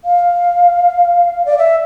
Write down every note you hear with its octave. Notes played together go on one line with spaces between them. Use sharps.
F5
D5
E5